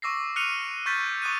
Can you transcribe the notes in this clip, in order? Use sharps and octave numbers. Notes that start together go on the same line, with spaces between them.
C#6 D6 E6 A#6 C7
F6 F#6 C#7 D#7 F7
C#6 F6 G6 A6 B6
C#6 D#6 F#6 D#7